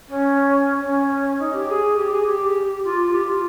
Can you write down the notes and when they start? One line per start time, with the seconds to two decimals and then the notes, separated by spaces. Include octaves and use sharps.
0.08 C#4
0.80 C#4
1.39 D#4
1.53 G4
1.68 G#4
1.96 G4
2.11 G#4
2.26 G4
2.84 F4
3.13 G4
3.28 F4